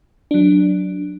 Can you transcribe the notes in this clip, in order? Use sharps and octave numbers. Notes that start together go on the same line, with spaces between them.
F#3 D4